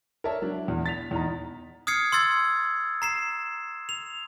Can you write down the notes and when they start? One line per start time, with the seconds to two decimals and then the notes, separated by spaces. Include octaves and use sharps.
0.24 A#4 C#5 D5 E5 A5
0.42 F#3 D4
0.68 E2
0.86 A6 B6 F7
1.11 E2 D#4 A#5
1.87 D#6 F6 G#6 C7 C#7
2.12 C6 E6 G#6 A6
3.02 A#5 C7 E7
3.89 F7